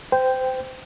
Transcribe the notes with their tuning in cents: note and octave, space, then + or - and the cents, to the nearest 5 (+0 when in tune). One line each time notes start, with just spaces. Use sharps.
C5 -25 G5 +0